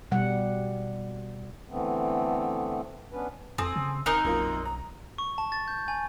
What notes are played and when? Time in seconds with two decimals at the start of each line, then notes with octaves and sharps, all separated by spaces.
0.12 B2 G3 F#5
1.69 D3 E3 A3 B3 C4
3.12 B3 C#4 D4 B4
3.58 F2 C4 A4 G#5 D#6
3.76 C#3
4.06 D#1 C4 D#4 A#4 G#5 D#6 F#6
4.25 B1 F#2 A#3 F4
4.65 A#5
5.18 C#6
5.38 A5
5.52 A6
5.68 G6
5.88 G#5